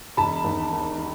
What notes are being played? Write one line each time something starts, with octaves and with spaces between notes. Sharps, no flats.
E1 A5 B5
D#2
D#3
D#3